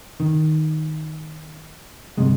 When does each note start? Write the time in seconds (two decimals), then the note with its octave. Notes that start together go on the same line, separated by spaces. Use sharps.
0.20 D#3
2.18 G1 C2 C3 G#3